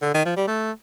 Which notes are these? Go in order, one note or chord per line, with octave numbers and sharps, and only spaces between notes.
D3
D#3
F3
G3
A3